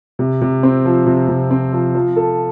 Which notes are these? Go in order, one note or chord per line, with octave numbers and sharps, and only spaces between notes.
C3
C3
C4
F3
C3
C3
C4
F3
F3
A4